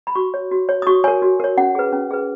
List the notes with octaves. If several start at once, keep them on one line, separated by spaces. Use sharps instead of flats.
B5
F#4 C#6
C#5
F#4
C#5
D#6
F#4 C#6
A#4 C#5 G#5
F#4
A#4 C#5
C#4 F#5
G#4 B4
C#4
G#4 B4